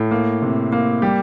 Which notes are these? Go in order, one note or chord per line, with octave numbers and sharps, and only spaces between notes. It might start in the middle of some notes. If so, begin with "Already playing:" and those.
Already playing: A2
A#3
C3
A#3
G3 G4